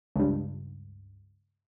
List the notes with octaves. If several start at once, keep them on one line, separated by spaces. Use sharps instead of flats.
C#2 G2